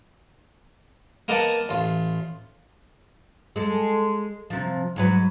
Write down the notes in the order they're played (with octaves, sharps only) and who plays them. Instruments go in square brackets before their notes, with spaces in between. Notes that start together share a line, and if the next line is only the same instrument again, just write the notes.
[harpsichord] A#3 B3 A#4 D#5 F#5 A5
A1 F4
[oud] G#3 A4
C3 F3
G#2 F#3 B4